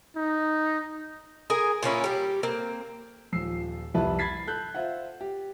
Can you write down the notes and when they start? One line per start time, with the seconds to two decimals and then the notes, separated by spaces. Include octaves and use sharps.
0.16 D#4
1.50 G#4 A#4 G#5
1.83 A#2 A#3 C#4 E4
2.04 G3 G4
2.43 A#3 C4
3.32 D#1 F3 E6 C7
3.94 C2 F2 G3 E4 B4 A5
4.19 B5 G#6 A6 B6 C7
4.47 A4 F#6 G6
4.74 F4 C5 E5 F#5
5.21 G4